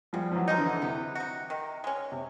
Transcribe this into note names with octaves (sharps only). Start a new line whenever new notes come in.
C#3 F3 G3
F3
E3 F#3
F3 A#3 D#4
D3 E3
C3 B3
D#4 F#4
D#3
G#3 C#4
C3